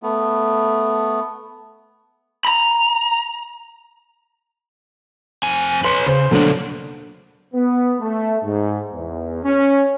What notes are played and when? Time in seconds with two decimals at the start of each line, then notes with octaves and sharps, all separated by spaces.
0.03 A3 B3
2.45 A#5 B5
5.43 F2 C4 G#5
5.85 B4 C#5 C6
6.07 C#3 C5
6.31 B2 D3 F#3 A3 A#3 D4
7.53 B3
8.00 A3
8.42 G#2
8.92 E2
9.43 C#4